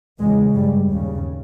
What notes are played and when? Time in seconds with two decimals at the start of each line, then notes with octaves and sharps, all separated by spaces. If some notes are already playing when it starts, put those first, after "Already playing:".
0.20 E2 C#3 G#3
0.54 G2 G3
0.89 D#2 C#3